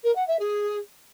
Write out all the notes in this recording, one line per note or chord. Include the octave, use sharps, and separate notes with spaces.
A#4
F#5
E5
G#4